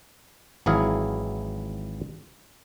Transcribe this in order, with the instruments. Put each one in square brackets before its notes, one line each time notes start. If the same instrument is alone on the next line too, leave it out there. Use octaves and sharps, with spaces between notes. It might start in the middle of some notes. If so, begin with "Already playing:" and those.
[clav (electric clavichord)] G#1 E3 F#3 E4 G#4 F5